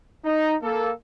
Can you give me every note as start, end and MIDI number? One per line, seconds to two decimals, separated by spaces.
0.25 0.54 63
0.62 0.91 58
0.62 0.91 69